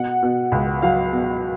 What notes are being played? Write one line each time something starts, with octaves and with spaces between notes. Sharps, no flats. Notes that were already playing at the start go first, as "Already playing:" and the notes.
Already playing: B2 F#5
B2
C#2
F#3 F5
B2